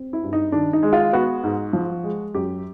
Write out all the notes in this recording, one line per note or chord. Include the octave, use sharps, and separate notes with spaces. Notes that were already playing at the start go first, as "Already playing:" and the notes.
Already playing: C4
E4
G2
D#4
D#3 D4
D#4
G#3
F4
B3 F#4
G#2
F3
G#3
F#2 G4